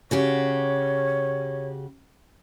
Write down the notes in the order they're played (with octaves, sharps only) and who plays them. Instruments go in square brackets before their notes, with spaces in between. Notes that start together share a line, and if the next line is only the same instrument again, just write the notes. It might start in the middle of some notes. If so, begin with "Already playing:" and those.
[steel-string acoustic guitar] C#3 F#4 G4 [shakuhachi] C#5